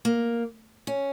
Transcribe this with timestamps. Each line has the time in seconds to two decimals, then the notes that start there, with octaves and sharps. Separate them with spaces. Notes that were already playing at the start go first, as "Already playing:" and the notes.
0.05 A#3
0.87 C#4